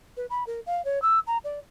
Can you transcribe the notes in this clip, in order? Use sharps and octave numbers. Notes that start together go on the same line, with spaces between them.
B4
B5
A#4
F5
C#5
E6
A#5
D5